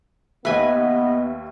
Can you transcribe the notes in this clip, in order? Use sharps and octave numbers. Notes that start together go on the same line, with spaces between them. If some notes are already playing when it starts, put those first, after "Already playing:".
D#2 B3 B4 D#5 E5 G#5